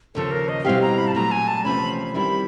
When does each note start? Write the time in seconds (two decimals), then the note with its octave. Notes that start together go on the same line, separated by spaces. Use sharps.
0.15 D#2 C#3 F3 A4
0.31 A#4
0.49 D#5
0.65 B2 G3 C4 E4 G4 F5
0.81 A#5
0.98 B5
1.07 A5
1.14 A#2 F#3 A3 A#5
1.31 G#5
1.47 A5
1.64 E2 C3 F3 A3 C#4 B5
2.14 D#3 G3 C4 E4 B5